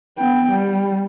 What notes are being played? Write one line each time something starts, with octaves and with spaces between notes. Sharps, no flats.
B3 G5
G3